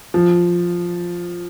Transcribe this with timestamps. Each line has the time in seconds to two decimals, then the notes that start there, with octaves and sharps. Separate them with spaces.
0.14 F3